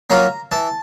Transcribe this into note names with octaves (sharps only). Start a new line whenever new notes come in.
F#3 A#3 C#4 F4 A#5
E3 A5